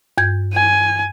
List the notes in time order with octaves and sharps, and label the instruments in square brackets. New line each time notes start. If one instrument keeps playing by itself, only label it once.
[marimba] G2 G6 G#6
[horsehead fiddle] G#5